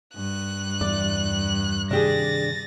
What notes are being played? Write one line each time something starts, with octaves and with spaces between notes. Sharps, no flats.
G2 F#6
E2 D5
C3 D#3 D4 G4 G#4 A6 A#6